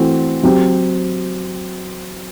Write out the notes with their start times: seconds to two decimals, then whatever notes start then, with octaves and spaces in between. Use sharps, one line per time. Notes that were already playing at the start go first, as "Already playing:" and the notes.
Already playing: E3 A3 C4 F#4
0.43 F#3 C4 G4